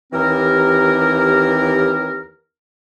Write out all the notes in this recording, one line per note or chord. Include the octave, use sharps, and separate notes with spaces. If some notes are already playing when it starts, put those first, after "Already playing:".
D#2 E3 C4 G4 A#4